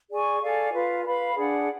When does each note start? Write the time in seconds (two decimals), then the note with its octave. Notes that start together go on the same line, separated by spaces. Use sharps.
0.11 G#4 D5 G#5 C#6
0.42 A4 D5 F5 G#5
0.73 F4 B4 F5
1.06 B4 F5 B5
1.36 D4 G#4 D5 F#5